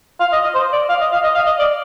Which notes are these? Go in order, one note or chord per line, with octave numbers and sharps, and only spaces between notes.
F5
D#5
D#5
C5
D5
F5
D#5
F5
D#5
F5
D#5
D5